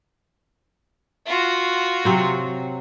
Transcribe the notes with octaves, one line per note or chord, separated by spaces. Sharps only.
F4 F#4
C3 F#3 C4